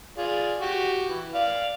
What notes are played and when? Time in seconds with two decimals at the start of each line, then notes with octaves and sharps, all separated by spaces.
0.18 F4 G#4 D5
0.61 F#4 G4
1.09 E3
1.35 D5 F5